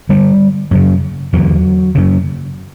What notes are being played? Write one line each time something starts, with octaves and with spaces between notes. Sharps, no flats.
G2 D3 G3
F#2 C#3
E2 D3 F#3
F#2 C#3